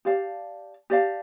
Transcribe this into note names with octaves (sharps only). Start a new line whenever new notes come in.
G4 D5 F5 A5
G4 D5 F5 A5